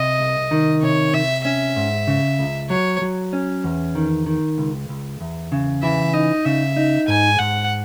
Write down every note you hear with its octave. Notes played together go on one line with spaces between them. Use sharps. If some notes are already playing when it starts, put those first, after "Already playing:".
Already playing: C3 D#5
C2
D#3
C3 C#5
C3 E5
C#4 E5
G#2
C#3
C#2
F#3 C#5
F#3
C#4
E2
D#3
D#3
C#2
C#2
E2
C#3
E3 E5
D#4 D#5
C#3 E5
D#4
G#2 G#5
G#2 F#5